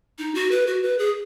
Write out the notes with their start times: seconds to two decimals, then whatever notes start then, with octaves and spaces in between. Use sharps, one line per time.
0.18 D#4
0.35 F#4
0.51 B4
0.67 F#4
0.83 B4
0.99 G#4